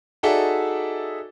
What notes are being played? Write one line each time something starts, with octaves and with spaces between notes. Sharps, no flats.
D#4 F#4 G#4 A4 D5 E5